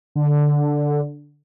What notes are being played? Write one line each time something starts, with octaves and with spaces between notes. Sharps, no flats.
D3